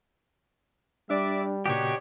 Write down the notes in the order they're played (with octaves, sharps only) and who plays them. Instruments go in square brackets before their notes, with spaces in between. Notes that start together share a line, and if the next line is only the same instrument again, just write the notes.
[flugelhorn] G3 [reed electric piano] D4 [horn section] D5 E5
[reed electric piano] A#2 C#3 F#4 [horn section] B3 D4 D#4 [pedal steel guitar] G4 C#5